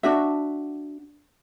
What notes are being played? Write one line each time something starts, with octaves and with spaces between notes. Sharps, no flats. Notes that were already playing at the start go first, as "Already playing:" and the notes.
D4 F#4 E5